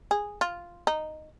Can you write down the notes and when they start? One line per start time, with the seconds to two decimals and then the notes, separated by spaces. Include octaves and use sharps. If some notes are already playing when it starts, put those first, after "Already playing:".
0.11 G#4
0.41 F4
0.87 D#4